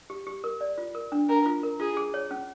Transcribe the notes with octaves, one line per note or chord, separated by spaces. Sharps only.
G4
G4
A#4
D5
F4
A#4
D4
D4 A#4
F4
A#4
F4 G#4
G#4
C#5
C#4